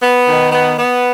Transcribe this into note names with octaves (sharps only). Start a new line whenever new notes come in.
B3
D#3
B3
B3